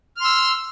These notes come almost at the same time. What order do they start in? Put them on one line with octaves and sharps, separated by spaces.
F6 C6 E6